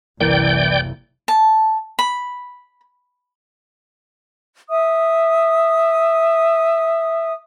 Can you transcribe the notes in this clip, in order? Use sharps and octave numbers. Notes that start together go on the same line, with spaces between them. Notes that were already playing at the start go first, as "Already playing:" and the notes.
F#1 C2 E3 A#3 D5 G5 G6
A5
B5
E5 D#6